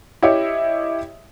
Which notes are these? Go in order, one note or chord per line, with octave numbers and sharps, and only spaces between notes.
E4 G4 C#5 D#5 E5